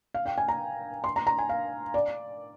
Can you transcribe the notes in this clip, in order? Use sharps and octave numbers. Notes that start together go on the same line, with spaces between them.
F5
G5
G#5
A#5
C6
A#5
A#5
G#5
F5
D5